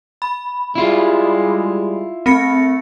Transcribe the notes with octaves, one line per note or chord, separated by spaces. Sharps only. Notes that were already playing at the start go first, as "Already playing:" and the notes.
B5
G3 G#3 E4 F4
A3 C4 A#6 C#7